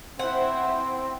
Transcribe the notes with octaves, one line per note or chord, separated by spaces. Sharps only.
C4 E4 C5 F#5